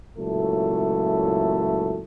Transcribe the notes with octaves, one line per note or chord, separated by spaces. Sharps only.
C#2 A#2 F#3 A3 E4 A4